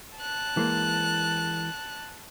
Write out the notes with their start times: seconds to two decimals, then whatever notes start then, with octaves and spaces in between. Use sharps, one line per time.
0.18 A5 F#6
0.57 E3 G#3 A#3